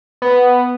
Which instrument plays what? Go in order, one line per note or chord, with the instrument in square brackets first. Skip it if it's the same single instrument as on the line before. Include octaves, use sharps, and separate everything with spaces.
[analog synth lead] B3